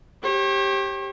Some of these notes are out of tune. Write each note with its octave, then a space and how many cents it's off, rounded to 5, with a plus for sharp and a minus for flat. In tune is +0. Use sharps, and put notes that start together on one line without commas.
G4 +0 C#5 -45